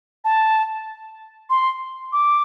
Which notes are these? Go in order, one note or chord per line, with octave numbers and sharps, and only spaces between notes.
A5
C6
D6